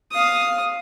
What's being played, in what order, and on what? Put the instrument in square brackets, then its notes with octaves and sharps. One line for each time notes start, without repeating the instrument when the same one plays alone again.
[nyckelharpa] F5 D#6